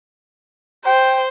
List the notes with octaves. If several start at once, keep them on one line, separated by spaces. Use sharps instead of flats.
C5 G5